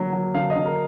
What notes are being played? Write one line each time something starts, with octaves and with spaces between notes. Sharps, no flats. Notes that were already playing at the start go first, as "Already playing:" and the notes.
Already playing: D3 F#3 A#3
F#3
D3 F5
D#5
D3
A#4